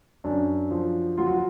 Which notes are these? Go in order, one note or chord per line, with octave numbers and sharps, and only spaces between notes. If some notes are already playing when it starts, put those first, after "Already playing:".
F#2 D4
F3
F#3 F4
F#4
F4